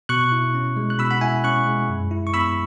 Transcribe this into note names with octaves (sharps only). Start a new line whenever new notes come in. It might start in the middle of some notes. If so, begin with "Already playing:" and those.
B2 C#6 F#6
E4
C#4
G#3
F#6
B2 B5 E6
F#5 B5
E4 E5 G#5
C#4 C#6 F#6
G#3
F#2
E4
C#6
B3 B5 E6